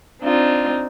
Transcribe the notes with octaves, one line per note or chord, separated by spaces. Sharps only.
C4 D4 D#4 F4